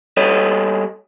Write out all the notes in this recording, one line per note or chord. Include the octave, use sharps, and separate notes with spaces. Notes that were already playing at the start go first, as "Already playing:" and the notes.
G3 A4 C#5 D#5